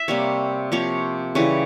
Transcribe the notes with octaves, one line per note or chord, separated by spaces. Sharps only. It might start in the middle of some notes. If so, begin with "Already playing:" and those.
Already playing: E5
C3 G3 A#3 C#5
C3 F3 A#3 C#5
C#3 E3 G3 C#5